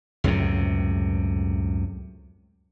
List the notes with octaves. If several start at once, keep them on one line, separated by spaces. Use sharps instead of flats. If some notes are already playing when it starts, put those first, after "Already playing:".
C#2 F#2 A2 C3